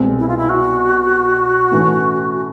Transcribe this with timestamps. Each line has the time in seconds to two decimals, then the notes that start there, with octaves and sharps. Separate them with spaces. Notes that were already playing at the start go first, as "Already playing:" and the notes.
Already playing: C2 B2 G#3 C4
0.18 E4
0.28 F4
0.37 E4
0.49 F#4
1.72 A2 E3 A3 C#4